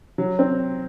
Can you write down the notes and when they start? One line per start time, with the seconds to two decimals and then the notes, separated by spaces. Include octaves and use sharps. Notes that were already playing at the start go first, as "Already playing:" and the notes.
0.18 F#3
0.39 C4